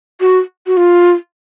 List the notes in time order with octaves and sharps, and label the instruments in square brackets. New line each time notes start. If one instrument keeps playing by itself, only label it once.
[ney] F#4
F#4
F4